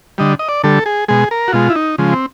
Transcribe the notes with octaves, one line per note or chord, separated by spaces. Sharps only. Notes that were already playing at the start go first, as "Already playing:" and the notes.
D3 G3 D#5
D#5
D5
D3 G3 A4
G#4
B2 G#3 G#4
A#4
F#4
B2 G#3 F4
E4
D#4
C#3 F3 G#3
C4